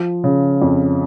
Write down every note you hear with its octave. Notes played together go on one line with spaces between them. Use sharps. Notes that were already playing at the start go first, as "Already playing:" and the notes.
Already playing: F3
C#3
F2